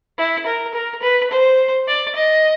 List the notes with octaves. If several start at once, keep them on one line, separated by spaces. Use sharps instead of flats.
E4
A#4
A#4
B4
C5
D5
D#5